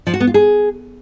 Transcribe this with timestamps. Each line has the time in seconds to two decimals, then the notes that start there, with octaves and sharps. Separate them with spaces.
0.07 F3
0.14 F#4
0.20 B3
0.27 F4
0.34 G#4